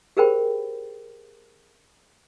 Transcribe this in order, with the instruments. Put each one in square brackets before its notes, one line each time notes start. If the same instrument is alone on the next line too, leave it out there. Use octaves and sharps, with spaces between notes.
[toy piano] G4 G#4 A#4 C5 G5 B5